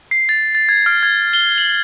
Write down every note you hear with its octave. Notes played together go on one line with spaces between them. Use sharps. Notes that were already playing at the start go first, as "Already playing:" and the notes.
C7
A6
A6
G#6
F6
G#6
G7
F#7